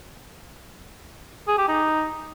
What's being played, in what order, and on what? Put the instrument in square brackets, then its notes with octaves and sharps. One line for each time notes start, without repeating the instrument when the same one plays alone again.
[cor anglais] G#4
G4
D#4